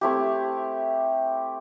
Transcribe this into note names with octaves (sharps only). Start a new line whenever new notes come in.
A3 C4 E4 G4